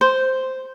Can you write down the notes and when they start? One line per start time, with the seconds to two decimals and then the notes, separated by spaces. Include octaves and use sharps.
0.01 C5